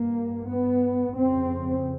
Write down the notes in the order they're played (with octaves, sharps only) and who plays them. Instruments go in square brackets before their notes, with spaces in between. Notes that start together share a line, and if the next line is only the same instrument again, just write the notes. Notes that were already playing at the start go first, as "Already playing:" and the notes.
Already playing: [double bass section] G2 A#3
B3
F2 C#3 C4